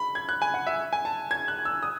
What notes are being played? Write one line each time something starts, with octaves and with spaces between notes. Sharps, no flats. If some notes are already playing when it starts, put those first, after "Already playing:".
Already playing: B5
G#6
F#6
G#5
F#5
E5
G#5
A5
G#6
F#6
E6
D#6